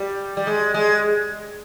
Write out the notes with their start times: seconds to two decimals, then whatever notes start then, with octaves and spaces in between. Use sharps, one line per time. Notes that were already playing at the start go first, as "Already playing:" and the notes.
Already playing: G3
0.37 G3
0.47 G#3
0.74 G#3